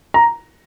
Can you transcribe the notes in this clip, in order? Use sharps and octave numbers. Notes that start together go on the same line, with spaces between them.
A#5